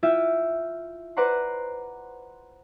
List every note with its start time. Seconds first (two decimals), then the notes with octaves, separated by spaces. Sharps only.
0.03 E4 F4 E5 G5
1.17 B4 C5 D5 F#5 A#5 C6